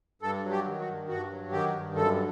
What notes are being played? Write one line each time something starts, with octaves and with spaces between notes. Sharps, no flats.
G2 A4
F#3
G4
D#3
F#4
G2
G2 F#4
F#3
D#3 G4
G2
F#2 A4